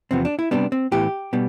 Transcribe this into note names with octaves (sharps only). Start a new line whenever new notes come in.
E2 C3 F3 B3 C4
D4
E4
C3 G3 B3 D4
C4
A2 E3 B3 G4
B2 G3 B3